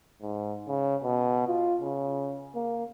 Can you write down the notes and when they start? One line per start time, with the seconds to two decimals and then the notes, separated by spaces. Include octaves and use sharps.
0.22 G#2
0.68 C#3
1.03 B2
1.47 F4
1.81 C#3
2.55 A#3